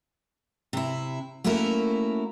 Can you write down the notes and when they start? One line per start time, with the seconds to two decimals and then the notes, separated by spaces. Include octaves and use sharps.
0.73 C3 E4
1.44 A3 A#3 C#4 E4 F#4 A#4